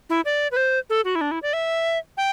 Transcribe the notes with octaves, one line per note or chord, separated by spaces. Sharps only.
E4
D5
B4
C5
A4
F#4
E4
D4
E4
D5
E5
G5